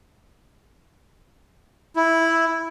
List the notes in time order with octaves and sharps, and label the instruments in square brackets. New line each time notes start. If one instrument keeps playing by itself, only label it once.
[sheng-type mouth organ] E4